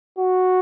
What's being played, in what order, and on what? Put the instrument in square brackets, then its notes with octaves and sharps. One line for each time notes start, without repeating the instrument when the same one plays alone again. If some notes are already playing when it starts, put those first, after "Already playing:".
[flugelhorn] F#4